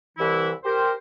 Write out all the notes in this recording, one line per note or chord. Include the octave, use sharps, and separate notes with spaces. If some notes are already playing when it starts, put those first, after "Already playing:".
C2 E3 E4
G4 A#4 C5